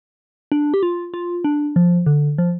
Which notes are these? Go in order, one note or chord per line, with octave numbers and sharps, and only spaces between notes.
D4
G4
F4
F4
D4
F3
D3
F3